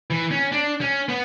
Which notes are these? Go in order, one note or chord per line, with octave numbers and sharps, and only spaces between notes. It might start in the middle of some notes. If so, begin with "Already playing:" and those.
E3
C#4
D4
C#4
B3